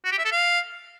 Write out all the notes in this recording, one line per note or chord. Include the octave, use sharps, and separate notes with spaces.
F#4
G4
E5
A4
F5